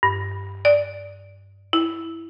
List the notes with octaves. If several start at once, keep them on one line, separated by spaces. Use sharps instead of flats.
G2
D5
E4